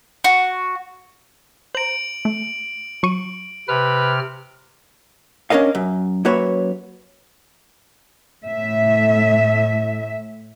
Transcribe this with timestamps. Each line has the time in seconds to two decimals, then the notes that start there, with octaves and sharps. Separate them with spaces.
0.24 F#4
1.75 C5 A#5 D7 F#7
2.25 A3
3.03 F#3 C#6 D#7
3.68 C3 B4 F6
5.50 C#4 D4 A#4 D#5 F5
5.75 F#2
6.25 F#2 A#3 F#4 B4 C#5 E5
8.44 A2 E5